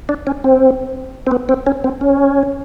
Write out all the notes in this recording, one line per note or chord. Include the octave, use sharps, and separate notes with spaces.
D4
C#4
C4
C4
B3
C4
C#4
C4
C#4